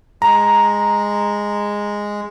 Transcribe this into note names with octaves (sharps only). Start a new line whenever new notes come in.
G#3 A#5